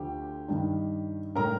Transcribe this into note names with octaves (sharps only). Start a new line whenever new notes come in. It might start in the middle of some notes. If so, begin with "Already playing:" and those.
Already playing: D2 D3 F3 G4
G2 D#3 G3 D4
A2 G3 D4 A#4 A#5